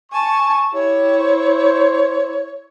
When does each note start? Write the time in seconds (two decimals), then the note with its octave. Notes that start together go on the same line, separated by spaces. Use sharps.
0.12 G#5 A5 C#6
0.74 E4 G4 C#5
1.18 C5